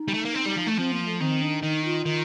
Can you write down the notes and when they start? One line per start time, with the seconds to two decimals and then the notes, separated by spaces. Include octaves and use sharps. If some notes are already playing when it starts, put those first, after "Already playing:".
Already playing: D#4
0.08 G3
0.14 A3
0.25 A#3
0.34 C4
0.46 G3
0.57 F3
0.67 A3
0.77 F3 C4
0.92 A#3
1.06 A3
1.20 D#3 C4
1.42 D4
1.62 D#3 D#4
1.84 F4
2.05 D#3